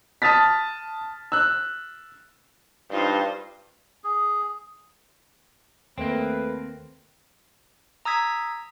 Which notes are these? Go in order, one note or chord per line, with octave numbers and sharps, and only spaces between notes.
A5 D#6 F6 A6 B6
E6 F#6
G2 D#4 F4 C5
G#4
D#2 A3 A#3 C4 B4
A#5 D#6 E6 G#6 B6